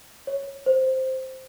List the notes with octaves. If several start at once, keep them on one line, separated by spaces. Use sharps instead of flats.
C#5
C5